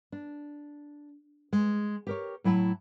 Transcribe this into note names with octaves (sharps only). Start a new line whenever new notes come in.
D4
G#3
G4 A#4 C#5
A2 F#3 E4 F#5 A5